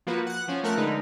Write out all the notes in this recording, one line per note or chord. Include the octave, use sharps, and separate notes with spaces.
F3 A#3 F#4 B4
F#5 F#6
F3 C#4
F3 A3 A#4 F#5 F#6
D3 G#3 D#4 A#4 B4